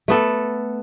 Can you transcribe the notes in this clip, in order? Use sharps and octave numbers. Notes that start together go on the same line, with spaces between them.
A3 B3 A4